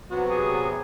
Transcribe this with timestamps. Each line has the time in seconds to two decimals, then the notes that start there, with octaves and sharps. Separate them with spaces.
0.11 C3 F#3 B3 F#4
0.30 G#4